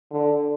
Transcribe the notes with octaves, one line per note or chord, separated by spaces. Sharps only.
D3